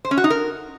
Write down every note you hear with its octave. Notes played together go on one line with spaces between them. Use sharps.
C5
C#4
F#4
D#4
A#4